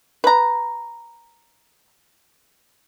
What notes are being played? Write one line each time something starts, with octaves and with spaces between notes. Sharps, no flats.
B4 A#5